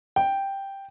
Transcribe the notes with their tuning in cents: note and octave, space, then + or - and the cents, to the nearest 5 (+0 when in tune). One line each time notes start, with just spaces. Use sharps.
G5 +0